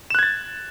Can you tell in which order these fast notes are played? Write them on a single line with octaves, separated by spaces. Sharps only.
E7 F#6 G#6 A6